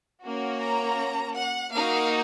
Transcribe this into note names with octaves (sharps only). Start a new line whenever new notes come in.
A#3 C#4 F#4
A#5
F#5
A#3 D#4 F#4 F5